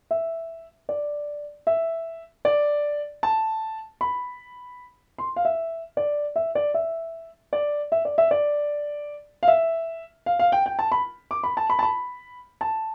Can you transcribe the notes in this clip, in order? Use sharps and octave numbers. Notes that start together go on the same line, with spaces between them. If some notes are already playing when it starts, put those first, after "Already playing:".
E5
D5
E5
D5
A5
B5
C6
F5
E5
D5
E5
D5
E5
D5
E5
D5
E5
D5
F5
E5
F5
F5
G5
G5
A5
B5
D6
B5
A5
B5
A5
B5
A5